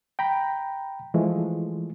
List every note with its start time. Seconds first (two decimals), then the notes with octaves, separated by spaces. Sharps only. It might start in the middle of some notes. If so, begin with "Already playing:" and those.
0.19 G5 A#5 B5
1.14 E3 F3 G#3 A3